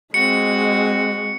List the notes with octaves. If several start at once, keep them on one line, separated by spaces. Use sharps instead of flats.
G#3 C4 F#4 C#7